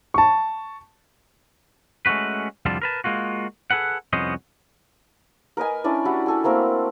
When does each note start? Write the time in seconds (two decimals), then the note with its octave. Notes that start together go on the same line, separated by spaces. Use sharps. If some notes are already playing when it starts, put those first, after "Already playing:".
0.14 A5 C#6
2.06 G#3 A3 C#4 F#4 B4
2.66 C2 F2 D3 G3 F4 A5
2.82 A#4 B4 A5
3.04 G#3 A#3 F4 F#4
3.71 G#4 A4 B4 F#5
4.13 C2 F2 B3 C#4 C5 D#5
5.57 A#4 B4 D#5 G#5
5.84 C#4 D4 E4 D5
6.05 G3 E4 F#4
6.26 A4 G#5
6.44 A3 A#3 C4 A#4